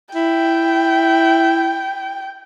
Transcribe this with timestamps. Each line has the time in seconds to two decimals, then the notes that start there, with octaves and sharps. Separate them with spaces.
0.15 E4 G5